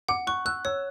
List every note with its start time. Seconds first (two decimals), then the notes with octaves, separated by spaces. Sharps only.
0.09 F#5 D6
0.27 C#6 F#6
0.46 E6 F#6
0.65 C#5 E6